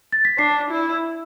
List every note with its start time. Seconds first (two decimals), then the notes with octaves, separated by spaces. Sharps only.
0.12 A6
0.25 B6
0.38 D4 C7
0.70 E4